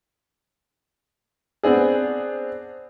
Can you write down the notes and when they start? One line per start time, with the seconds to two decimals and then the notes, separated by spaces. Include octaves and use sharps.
1.63 B3 C4 D4 G#4